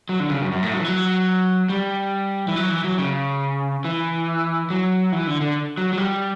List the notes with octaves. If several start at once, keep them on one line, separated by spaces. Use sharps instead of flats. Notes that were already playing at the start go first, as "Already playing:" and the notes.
F#3
D3
C#3
F#2
F#2
A2
F#3
E3
F#3
G3
E3
F#3
E3
F#3
C#3
E3
F#3
E3
D3
D3
F#3
F#3
G3